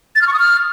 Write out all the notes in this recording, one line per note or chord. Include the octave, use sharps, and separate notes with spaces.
A6
F6
C#6
D#6
F6